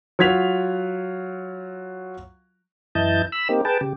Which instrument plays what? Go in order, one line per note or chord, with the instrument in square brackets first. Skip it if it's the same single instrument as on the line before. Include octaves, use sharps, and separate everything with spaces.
[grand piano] F#3 F4 G#6 B6 F7
[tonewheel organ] F#2 E3 E4 D#5 A5 G6
B5 E6
A#3 C4 D#4 G4
G#4 B4 G5 A5
C#3 G4